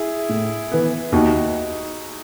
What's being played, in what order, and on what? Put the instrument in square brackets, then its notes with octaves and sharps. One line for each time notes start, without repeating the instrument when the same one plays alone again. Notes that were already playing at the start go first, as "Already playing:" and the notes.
Already playing: [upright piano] E4 G#4
[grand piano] A2
E3 B3
[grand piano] D#2 [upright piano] D#4 F#4